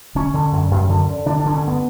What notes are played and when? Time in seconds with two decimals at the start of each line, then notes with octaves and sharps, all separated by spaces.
0.15 D3 C#4
0.34 D3
0.52 F#2
0.71 F#2
0.89 D3
1.07 D3
1.26 D3 D4
1.40 D4
1.45 D3
1.54 C#4
1.63 G2 B3